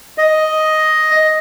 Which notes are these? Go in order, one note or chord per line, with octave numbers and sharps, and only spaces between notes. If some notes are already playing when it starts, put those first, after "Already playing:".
D#5